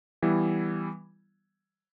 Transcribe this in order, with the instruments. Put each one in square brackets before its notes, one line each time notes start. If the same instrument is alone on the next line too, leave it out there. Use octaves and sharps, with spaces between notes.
[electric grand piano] E3 G3 B3 E4